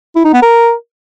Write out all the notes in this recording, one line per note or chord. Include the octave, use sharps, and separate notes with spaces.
E4
D#4
B3
A#4